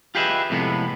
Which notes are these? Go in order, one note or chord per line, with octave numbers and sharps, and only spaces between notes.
F4 G4 G#4 B4 D#5 E5
F2 A2 C3 G#3 B3